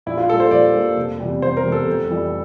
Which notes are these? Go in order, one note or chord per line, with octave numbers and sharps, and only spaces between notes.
A#1 E4
F4
A#2 G3 A#3 A4
C5
A#1 D5
A#2 G3 A#3
F1
E2 C3 G3
F1 C5
A#4
E2 C3 G3
A4
F1
F2 E3 G3